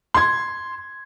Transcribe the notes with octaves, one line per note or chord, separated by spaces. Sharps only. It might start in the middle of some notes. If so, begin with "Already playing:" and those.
C6 G#6